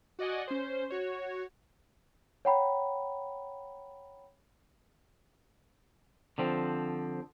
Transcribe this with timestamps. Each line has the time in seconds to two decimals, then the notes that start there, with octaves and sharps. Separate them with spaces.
0.19 F#4 D5 D#5 F#5 G#5
0.48 C#4 C5
0.90 F#4 C#5
2.45 C#5 F#5 G5 A#5 B5
6.38 D3 F3 C4